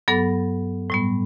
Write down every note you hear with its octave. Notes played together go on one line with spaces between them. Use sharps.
G2 F#3 B3 A4
A2 G3 B3